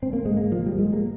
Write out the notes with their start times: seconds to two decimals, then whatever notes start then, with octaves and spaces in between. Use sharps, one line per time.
0.02 G#2 C4
0.13 A#3
0.26 G#3
0.37 A#3
0.52 F3
0.66 G3
0.79 G#3
0.93 A#3